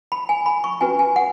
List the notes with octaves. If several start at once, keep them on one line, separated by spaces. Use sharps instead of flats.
B5
G#5
B5
C#6
C#4 F#4 B4 G#5
G#5
F#5